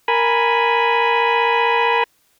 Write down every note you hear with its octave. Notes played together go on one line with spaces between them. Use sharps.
A#4 G#5 B5